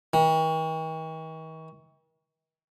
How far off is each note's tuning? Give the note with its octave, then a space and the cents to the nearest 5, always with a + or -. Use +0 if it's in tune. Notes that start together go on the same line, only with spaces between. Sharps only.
D#3 +45